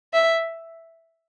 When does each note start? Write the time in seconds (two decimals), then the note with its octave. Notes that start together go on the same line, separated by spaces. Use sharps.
0.14 E5